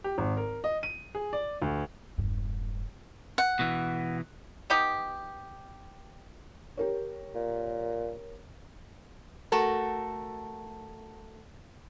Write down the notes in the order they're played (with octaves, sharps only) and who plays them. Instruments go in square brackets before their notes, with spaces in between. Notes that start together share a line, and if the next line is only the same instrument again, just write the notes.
[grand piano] G4
G#1
A#4
D#5
D#7
G#4
D5
D2
[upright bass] E1 G2
[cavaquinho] F#5
[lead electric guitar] B2 E3
[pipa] B3 D#4 G4
[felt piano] G4 A#4 C#5
[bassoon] A#2
[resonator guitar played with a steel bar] A3 F#4 A4 A#4